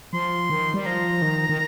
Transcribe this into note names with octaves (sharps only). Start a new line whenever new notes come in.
F3 C6
D#3
G3
F3 A#5
D#3
D#3